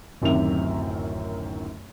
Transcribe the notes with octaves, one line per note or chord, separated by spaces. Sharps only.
D1 F#2 C3 D#3 E5 F7